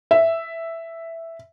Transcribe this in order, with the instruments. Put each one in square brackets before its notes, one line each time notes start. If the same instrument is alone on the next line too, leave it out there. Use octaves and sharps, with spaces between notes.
[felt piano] E5